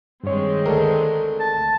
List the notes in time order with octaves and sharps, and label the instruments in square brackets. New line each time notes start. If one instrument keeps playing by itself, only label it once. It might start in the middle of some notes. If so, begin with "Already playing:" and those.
[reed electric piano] G2 C#5 [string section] D#3 G#3 C4
[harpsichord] D2 [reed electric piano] A4 A#4
[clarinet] A5